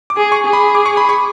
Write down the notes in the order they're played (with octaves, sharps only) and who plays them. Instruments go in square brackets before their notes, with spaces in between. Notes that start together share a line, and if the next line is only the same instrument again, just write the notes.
[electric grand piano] D6
[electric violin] G#4
[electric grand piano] C#6
[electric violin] G#4
[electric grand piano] B5
D6
C#6
B5
C#6